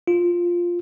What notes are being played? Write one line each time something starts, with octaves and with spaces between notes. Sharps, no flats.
F4